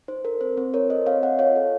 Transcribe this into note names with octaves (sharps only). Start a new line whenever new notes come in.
D#4 C5
A4 A#4
C4 C5
C4 C5
F4 A#4 C#5
A4 C5 D#5
C4 C#5 F5
C4 D#5 F#5
F4 C#5 F5
A4